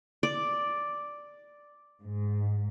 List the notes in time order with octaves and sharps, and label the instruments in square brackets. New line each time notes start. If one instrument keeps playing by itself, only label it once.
[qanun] D5
[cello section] G#2